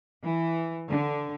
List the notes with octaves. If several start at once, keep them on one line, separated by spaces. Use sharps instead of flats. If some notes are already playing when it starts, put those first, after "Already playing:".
E3
D3